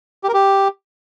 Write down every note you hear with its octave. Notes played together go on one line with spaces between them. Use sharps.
G4
A#4
G4